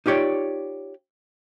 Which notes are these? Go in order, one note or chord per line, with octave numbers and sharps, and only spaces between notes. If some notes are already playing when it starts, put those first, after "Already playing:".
D#4 F4 G4 C#5 D5